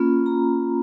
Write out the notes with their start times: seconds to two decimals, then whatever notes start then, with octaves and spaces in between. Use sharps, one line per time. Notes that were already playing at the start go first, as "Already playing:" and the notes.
Already playing: A#3 C#4 F4 B5
0.26 A#5